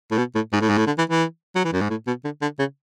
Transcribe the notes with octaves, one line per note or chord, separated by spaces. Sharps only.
A2
B2
A2
G#2
A2
G#2
A2
D3
E3
E3
F#3
E3
F#2
G#2
A2
B2
D3
D3
C#3